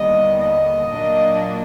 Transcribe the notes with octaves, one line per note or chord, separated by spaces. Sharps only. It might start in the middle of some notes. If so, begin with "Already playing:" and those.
Already playing: D#2 D3 G3 B3 D#5
D#5
A#2 F#3 A#3 D4